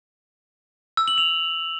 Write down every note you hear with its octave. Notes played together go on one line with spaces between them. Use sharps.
E6
F#7
F7